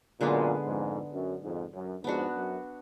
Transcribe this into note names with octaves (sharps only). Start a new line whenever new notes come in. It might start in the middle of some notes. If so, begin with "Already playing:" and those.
F#2 A#2 D3 G#3 B3
F2 G#2
F#2
F2 G#2
F#2
F2 G#2 B3 D4 F#4
F#2